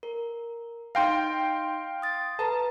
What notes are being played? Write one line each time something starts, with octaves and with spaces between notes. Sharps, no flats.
A#4
D#4 F5 G5 C6 A#6
D#6 A6
A4 B4 A5 A#5